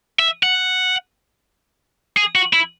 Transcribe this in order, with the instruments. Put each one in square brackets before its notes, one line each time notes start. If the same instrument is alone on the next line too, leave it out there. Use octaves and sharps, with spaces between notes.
[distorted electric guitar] E5
F#5
G#4
F#4
E4